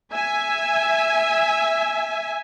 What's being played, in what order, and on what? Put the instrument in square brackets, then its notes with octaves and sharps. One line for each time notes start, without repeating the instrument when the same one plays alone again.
[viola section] E5 G#5